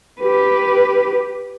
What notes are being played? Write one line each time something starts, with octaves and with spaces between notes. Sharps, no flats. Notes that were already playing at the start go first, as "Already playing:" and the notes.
G4 B4